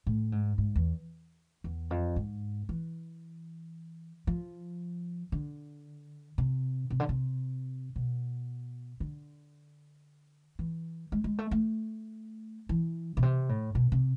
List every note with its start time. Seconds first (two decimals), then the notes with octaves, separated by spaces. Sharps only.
0.07 A2
0.32 G#2
0.58 G#2
0.76 E2
1.64 E2
1.91 F2
2.16 G#2
2.69 E3
4.27 F3
5.32 D3
6.38 C3
6.90 C3
7.00 D3
7.09 C3
7.96 B2
9.00 D3
10.59 E3
11.12 G#3
11.24 G#3
11.39 A3
11.51 A3
12.69 E3
13.17 B2
13.23 C3
13.49 A2
13.75 B2
13.92 C3